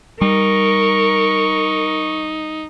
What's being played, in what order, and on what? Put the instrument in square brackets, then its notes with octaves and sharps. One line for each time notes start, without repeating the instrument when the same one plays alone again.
[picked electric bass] G3 [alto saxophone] D#4 [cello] A#4 [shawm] C#6